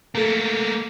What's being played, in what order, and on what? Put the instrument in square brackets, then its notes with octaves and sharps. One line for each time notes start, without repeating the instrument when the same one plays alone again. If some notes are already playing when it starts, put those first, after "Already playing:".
[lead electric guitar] A3 A#3 [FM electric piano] A4 A#5